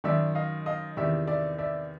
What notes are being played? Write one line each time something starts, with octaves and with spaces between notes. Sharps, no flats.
F#2 D#3 D5 E5
D#5 F5
D#5 F5
E2 C3 D#3 D5 E5
D5 E5
D5 E5